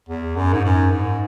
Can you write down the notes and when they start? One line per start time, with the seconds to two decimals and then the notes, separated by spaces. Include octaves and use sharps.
0.09 E2
0.36 F#2
0.53 G#2
0.64 F#2
0.92 G#2